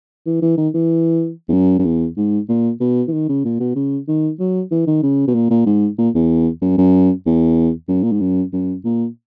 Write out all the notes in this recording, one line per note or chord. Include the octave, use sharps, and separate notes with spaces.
E3
E3
D#3
E3
E2
F#2
F#2
E2
G#2
A#2
B2
E3
D#3
C#3
A#2
B2
C#3
D#3
F#3
E3
D#3
C#3
B2
A#2
A#2
G#2
A#2
E2
F#2
F#2
E2
F#2
A#2
G#2
F#2
F#2
A#2